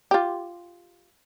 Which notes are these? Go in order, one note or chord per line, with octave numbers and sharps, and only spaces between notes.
F4 G4